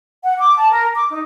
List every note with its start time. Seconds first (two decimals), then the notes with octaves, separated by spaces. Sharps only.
0.24 F#5
0.38 D6
0.58 A5
0.71 A#4
0.95 D6
1.11 D#4